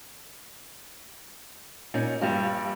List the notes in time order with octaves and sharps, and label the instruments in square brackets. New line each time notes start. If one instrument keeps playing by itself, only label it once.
[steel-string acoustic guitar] A#2 C#4 D#4
[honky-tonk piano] A#1 G2 F4 [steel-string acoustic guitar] G3 G4